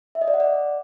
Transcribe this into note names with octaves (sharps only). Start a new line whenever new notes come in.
E5
D#5
D5
F#5
D5